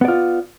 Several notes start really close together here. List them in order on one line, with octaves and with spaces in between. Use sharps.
B3 D5 F4